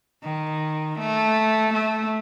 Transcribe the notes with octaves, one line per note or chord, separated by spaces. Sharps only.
D#3
A3
A3